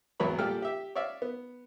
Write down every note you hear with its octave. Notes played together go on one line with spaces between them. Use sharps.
G#1 E2 F#3 B3 C#5 B5
A#2 G3 A#3 A4 G5 F6
G4 E5
C#5 D5 E5 F5
B3